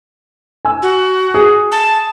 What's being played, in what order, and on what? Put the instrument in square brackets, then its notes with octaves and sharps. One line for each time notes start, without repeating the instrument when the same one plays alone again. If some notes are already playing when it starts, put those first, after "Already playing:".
[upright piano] G#5 E6
[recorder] F#4
[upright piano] G#4
[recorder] A5